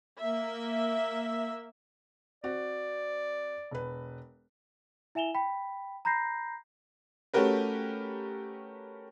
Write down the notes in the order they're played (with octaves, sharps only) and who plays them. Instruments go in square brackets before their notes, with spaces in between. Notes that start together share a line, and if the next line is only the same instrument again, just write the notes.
[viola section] A#3 E5
[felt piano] C4 F#4 [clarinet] D5
[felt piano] E1 B4
[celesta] E4 E5 G#5 E7 F7 G7
G5 B5 B6
A#5 B5 G6 A#6 C7
[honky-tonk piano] A3 C#4 F#4 G4 A#4 B4